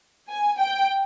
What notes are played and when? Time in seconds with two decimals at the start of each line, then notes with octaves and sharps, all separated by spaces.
0.30 G#5
0.59 G5